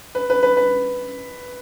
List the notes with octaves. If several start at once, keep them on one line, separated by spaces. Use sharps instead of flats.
B4
B4
B4
B4